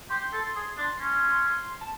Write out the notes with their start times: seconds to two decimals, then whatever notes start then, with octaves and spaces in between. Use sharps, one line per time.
0.10 G4 C6
0.32 A4
0.56 G#4
0.78 D4
1.00 C#4
1.81 A5